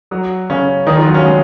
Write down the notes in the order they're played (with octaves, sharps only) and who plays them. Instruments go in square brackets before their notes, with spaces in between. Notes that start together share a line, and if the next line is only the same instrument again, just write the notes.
[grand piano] F#3 F#4
C#3 C#4
D#3 D#4
F3 F4
F#3 F#4
C#3 C#4
G#3